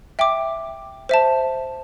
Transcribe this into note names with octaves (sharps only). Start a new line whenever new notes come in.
E5 G5 D6
C5 E5 A5